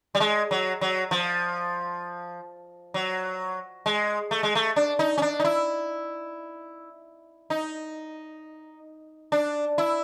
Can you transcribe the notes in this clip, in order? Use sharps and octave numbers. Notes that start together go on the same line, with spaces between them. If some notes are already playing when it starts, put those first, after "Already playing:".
G3
G#3
F#3
F#3
F3
F#3
G#3
A3
G#3
A3
D4
D#4
C#4
D4
D#4
E4
D#4
D4
E4